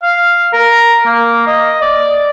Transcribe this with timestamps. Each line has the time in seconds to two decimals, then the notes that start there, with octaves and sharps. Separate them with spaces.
0.02 F5
0.53 A#4
1.06 A#3
1.47 D#5
1.82 D5